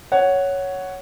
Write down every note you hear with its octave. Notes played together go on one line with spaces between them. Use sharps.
C#5 F#5